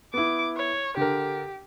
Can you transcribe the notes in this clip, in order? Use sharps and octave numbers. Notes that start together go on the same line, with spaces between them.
B3 E4 D6
C#5
D3 G4 A#4